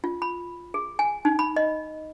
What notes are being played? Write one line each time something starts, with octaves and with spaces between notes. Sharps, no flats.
F4
B5
G#4
G#5
D#4
B5
D#5